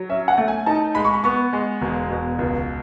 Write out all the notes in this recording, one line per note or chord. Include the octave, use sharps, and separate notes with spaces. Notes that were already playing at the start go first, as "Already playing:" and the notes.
Already playing: F#3
C#4 E5
F#5
A3
G#5
D#4 A5
G#3 B5
C#6
B5
B3 C#6
G#3
E1
B2
C#2